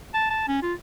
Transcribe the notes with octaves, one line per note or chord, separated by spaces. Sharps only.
A5
A5
C#4
F4